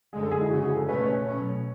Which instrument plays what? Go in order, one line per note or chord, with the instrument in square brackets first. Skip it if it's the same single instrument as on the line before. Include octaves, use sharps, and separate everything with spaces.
[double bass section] F#2 D3 G#3 [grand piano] G#4
[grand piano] A4
G#4
E4
[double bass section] C#3 E3 G#3 C#4 [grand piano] F#4
[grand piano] G#4
A4
[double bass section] B2 A3 C#4 [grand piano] B4
[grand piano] C#5
[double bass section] B2 F#3 A3 C#4